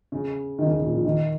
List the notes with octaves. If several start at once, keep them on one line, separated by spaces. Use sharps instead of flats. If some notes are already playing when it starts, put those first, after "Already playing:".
C#3
D#3
C#3
D#3
A#2
F3
D#3